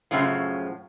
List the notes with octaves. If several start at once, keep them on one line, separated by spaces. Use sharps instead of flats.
F#2 A2 C#3 F3